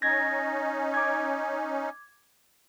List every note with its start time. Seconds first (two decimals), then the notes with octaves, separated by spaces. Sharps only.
0.02 C#4 D#4 G#6 A#6
0.94 D6 G#6